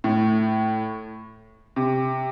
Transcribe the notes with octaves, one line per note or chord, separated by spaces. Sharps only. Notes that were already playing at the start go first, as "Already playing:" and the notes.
A2
C3